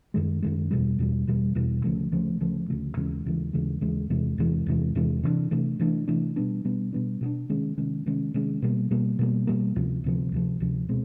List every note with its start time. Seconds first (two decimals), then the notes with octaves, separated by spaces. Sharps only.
0.14 F#2 D#3 G#3
0.42 F#2 D#3 G#3
0.71 E2 B2 G3
0.99 E2 B2 G3
1.27 E2 B2 G3
1.55 E2 B2 G3
1.84 D2 C#3 F3 A3
2.12 D2 C#3 F3 A3
2.40 D2 C#3 F3 A3
2.69 D2 C#3 F3 A3
2.97 D#2 C#3 E3 G#3
3.25 D#2 C#3 E3 G#3
3.53 D#2 C#3 E3 G#3
3.81 D#2 C#3 E3 G#3
4.10 E2 C3 E3 G#3
4.38 E2 C3 E3 G#3
4.66 E2 C3 E3 G#3
4.95 E2 C3 E3 G#3
5.23 C3 E3 A3 D4
5.51 C3 E3 A3 D4
5.79 C3 E3 A3 D4
6.08 C3 E3 A3 D4
6.36 B2 G3 B3 D4
6.65 B2 G3 B3 D4
6.93 B2 G3 B3 D4
7.21 B2 G3 B3 D4
7.49 C3 D#3 G#3 C#4
7.78 C3 D#3 G#3 C#4
8.06 C3 D#3 G#3 C#4
8.34 C3 D#3 G#3 C#4
8.62 B2 G3 A#3
8.91 B2 G3 A#3
9.19 B2 G3 A#3
9.47 B2 G3 A#3
9.76 D2 C3 F3
10.04 D2 C3 F3
10.32 D2 C3 F3
10.60 D2 C3 F3
10.89 B2 G#3 C4